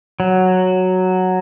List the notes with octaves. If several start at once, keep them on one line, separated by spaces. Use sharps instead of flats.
F#3